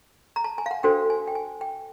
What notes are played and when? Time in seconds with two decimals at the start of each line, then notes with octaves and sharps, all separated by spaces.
0.36 A#5
0.44 A5
0.58 G#5
0.66 F5
0.71 F#5
0.83 D4 F#4 A4 C5 G5
1.10 G#5
1.28 G5
1.35 G#5
1.61 G5